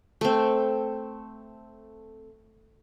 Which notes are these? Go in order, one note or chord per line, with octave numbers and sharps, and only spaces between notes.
A3 C4